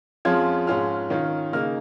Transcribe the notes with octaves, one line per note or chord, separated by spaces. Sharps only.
F2 F3 G#3 C#4 F4 G#6
G#2 G#3 C#4 F4 F6
D#3 C#4 F4
C#3 A#3 D#4 F6